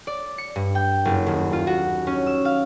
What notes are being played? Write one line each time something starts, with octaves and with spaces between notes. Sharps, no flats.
D5
C#7
G2
G5
F#1
D#1
F4
F#4
C#4
E6
F5